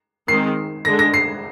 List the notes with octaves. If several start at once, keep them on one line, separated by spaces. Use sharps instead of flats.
D#3 G#3 C4 D#4 C7
D3 G#3 D4 A#6
A#6
C7